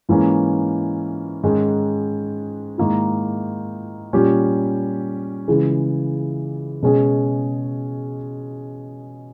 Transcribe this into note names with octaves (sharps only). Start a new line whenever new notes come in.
G#2 E3 A#3 C#4
G#2 D#3 G#3 C#4
G#2 D#3 A#3 E4
A#2 G3 C#4 G4
C#3 E3 G#3
B2 G#3 C#4 G#4